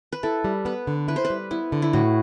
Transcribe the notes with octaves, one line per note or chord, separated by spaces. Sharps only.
B4
E4 A4
G3
B3 B4
D3
E4 B4
C5
B4
G3
B3 E4
D3
E4
A2 F#4